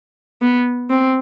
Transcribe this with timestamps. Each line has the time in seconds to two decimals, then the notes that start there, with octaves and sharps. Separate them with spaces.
0.42 B3
0.90 C4